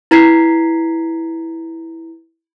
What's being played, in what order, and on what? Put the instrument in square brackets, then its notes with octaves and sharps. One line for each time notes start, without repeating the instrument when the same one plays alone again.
[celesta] E4 B4 A#5 G#6 B6 C7